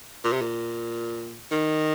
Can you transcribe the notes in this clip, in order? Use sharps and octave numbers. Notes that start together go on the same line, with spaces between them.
A#2
C3
A#2
D#3